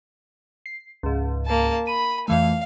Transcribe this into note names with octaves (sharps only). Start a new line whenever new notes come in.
C7
C#2 G#2
A#3 A5
B5 D#7
F2 E3 A3 F5